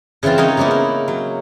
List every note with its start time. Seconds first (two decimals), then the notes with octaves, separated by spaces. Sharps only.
0.23 C#3 E3 F3 C4 F4
0.38 D#4 A#4 C#5 D#5
0.57 C#3 A#3 B3 D#4 E4
0.71 A#4
1.08 F#3